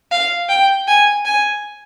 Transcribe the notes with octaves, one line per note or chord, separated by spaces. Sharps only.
F5
G5
G#5
G#5